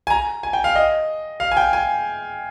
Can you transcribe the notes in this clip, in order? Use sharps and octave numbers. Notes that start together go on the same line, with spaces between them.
G#5
A#5
G#5
G5
F5
D#5
F5
G#5
G5
G#5